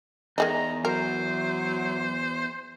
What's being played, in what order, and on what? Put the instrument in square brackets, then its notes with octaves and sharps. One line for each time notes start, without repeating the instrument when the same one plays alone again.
[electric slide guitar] E2 [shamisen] D#3 G#3 D#4 [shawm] A#5
[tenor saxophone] F#3 [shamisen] A#4 [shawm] C5